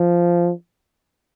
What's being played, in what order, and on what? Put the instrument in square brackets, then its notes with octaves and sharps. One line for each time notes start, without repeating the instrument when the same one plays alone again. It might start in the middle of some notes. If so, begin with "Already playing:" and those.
Already playing: [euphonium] F3